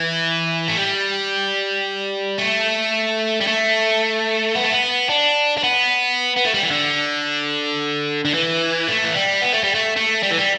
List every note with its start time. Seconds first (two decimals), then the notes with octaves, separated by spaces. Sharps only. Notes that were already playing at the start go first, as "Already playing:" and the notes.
Already playing: E3
0.68 A3
0.77 G3
2.39 A3
3.41 G3
3.47 A3
4.55 B3
4.64 A3
4.71 B3
5.09 D4
5.57 D4
5.63 B3
6.36 B3
6.45 A3
6.54 G3
6.63 E3
6.71 D3
8.25 D3
8.34 E3
8.88 A3
9.04 E3
9.15 G3
9.42 B3
9.53 A3
9.63 G3
9.74 A3
9.96 A3
10.23 G3
10.30 E3
10.38 G3